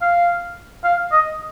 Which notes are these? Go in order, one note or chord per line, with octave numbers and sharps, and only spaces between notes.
F5
F5
D#5